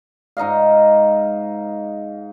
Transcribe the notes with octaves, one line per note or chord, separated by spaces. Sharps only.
G#2 D#4 D#5 F5